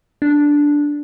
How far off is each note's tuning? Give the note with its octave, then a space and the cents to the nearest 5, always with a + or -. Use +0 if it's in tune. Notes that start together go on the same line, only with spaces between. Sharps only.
D4 -5